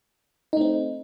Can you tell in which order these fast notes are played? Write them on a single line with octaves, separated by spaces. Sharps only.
D#4 A3 C4